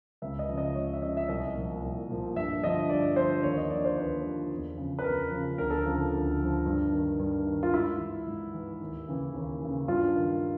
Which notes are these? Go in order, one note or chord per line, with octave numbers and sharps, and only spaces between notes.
C#2 E5
D#5
C#3 F3
D#5
C#2 C#5
E5
C#3 F3 D#5
E5
C2 D#5
A#2
F3
C2
A#2 F3
G2 E5
D3 F3 D#5
G2 D5
D3 F3 C5
D#2 C#5
D#5
D3 F3 D5
C5
D#2 B4
D3 F3
E2
C#3 F3
B4
E2 A#4
C#3 F3
D2 A#4
A4
C#3 F3 A#4
D2
C#3 F3
G2
D#3
G2
D#3
F4
G#2 E4
E3
G#2
E3
D#2
C#3 E3
D#2
C#3 E3
G2 F4
D#3